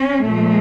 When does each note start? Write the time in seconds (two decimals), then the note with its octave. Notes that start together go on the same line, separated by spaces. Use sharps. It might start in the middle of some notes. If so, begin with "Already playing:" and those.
Already playing: C#4
0.21 A#2 F3 A3